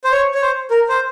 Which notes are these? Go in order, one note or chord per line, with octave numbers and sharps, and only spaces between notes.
C5
C#5
C#5
C5
A#4
C5